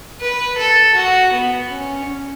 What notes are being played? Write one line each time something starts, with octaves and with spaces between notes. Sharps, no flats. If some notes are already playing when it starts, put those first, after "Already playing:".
B4
A4
F#4
B3
C#4